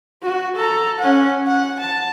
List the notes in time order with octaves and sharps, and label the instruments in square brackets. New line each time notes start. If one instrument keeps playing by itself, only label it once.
[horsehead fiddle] F#4
A4 A#5
C#4 F#5
F#5
A5